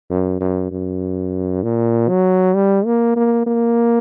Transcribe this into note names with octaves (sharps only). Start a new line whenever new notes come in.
F#2
F#2
F#2
A#2
F#3
G3
A#3
A#3
A#3